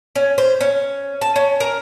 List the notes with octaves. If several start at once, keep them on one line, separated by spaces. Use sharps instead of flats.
C#4
C5
C#4
A5
C#4
A#4